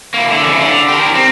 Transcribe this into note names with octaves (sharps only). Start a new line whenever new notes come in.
A#3 E4
D3
C#3 E3
D3
G4 A#4
C4